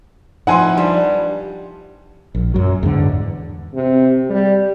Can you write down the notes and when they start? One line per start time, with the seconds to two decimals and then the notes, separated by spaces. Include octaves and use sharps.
0.47 F3 D#4 E4 F#5 G#5 C6
0.78 G3 D4
2.35 A#1
2.54 F#2 F#3
2.83 E2 G#2 D3
3.74 C3
4.30 G3